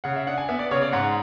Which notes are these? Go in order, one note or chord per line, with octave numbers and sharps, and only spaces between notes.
C#3 F#5
E5
D4 F#5
G#5
B3 E5
D5
C#3 C#5
D5
G#2 F#5